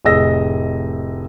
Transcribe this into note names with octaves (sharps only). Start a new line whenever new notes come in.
F1 A2 G#4 D#5 E6 A#6